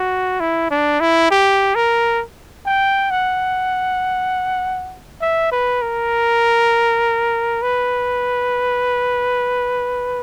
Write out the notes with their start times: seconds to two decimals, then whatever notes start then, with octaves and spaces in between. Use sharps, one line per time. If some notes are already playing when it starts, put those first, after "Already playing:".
Already playing: F#4
0.40 E4
0.71 D4
1.00 E4
1.31 G4
1.75 A#4
2.66 G5
3.11 F#5
5.21 E5
5.52 B4
5.82 A#4
7.62 B4